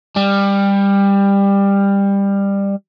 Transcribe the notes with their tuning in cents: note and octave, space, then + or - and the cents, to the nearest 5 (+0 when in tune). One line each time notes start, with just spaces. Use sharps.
G3 +20